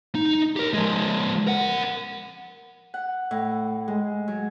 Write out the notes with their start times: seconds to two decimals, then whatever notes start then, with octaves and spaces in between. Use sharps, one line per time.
0.15 D#4
0.56 G4 A#4
0.74 F3 G#3
1.47 A#4 F#5
2.94 F#5
3.31 A2
3.88 G#3
4.28 F#3